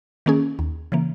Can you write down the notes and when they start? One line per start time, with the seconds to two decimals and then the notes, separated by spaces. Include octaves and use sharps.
0.26 D#3 A#3 C#4 G#4
0.59 D#2
0.92 C#3 E3 A#3